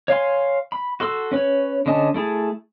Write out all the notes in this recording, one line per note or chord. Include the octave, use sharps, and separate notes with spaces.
C#5 F5 G#5 C6
B5
F#4 A4 C6 E6
C#4 B4 C#5
D3 C#4 D#5 G#5 A5
A3 E4 G#4 A5